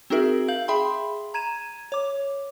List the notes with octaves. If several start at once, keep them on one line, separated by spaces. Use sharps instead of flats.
C4 D#4 F#4 G#4 A#4 E5
F5 G6 F#7
G#4 E5 G5 B5 C6
A#5 G#6 D#7 E7
C#5 D6